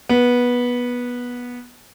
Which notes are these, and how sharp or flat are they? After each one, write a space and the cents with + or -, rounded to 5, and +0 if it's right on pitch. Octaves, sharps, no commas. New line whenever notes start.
B3 -15